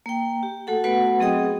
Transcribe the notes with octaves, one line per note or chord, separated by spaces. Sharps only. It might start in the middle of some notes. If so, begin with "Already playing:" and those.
A#3 G5
G4
A3 F#4 A4 F#5
A3 B3 F#4 B4 F#5 B5
F#3 C4 G#4 D#5 G5 D#6
G#4